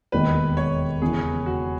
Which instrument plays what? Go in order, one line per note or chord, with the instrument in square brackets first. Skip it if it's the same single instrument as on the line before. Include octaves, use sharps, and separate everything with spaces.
[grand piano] E1 D#2 D#3 G#3 [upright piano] B4
[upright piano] C#5
[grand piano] E2 C#3 E3 [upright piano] G#4
[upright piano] F#4